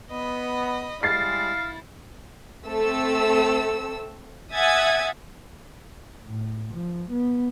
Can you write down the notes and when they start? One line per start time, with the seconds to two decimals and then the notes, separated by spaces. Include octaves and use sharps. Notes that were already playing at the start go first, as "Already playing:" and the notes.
0.11 B3 D#5 B5
1.03 G3 G#3 E4 F5 A6 C7
2.66 A3 C4 A4 E6
4.54 E5 F#5 G#5 D#6 G#6 A6
6.24 A2
6.73 F3
7.11 B3